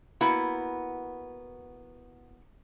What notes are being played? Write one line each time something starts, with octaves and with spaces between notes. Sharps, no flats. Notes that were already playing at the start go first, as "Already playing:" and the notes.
A#3 B3 E4 F#4